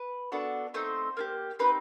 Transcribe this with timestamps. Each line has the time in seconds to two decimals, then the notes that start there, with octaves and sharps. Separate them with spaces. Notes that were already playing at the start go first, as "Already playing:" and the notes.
Already playing: B4
0.32 B3 D4 F#4 A4
0.74 A3 C4 D#4 C5
1.17 A#3 D4 G4
1.59 C4 D#4 G4 B4